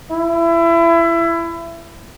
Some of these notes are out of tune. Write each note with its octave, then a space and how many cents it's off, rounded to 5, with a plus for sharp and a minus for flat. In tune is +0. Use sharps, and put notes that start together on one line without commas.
E4 +25